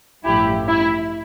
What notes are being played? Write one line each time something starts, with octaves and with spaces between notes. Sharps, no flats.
A1 G2 F3 A3 E4 G4
E4